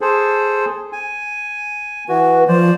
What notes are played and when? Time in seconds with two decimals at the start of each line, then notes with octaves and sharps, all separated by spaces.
0.01 G#4 A4 C5
0.93 G#5
2.09 E3 F#4 B4
2.48 F3 C5 D5